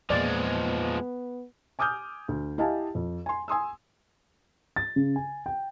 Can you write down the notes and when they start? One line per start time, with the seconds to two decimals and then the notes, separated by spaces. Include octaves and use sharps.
0.10 E2 A#2 F3 G#3 A#3 B3 D5
1.79 G#5 D6 D#6 F6 G6
2.28 D2
2.58 E4 G4 D#5 F5 G#5 A5
2.95 F2
3.26 G#5 C6
3.48 G#5 C6 D#6 E6
4.76 A6
4.96 C#3
5.16 G#5
5.46 G5